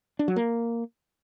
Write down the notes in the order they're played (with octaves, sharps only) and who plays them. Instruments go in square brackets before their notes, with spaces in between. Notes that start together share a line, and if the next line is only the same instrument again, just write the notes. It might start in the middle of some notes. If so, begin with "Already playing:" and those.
[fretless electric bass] D4
F#3
A#3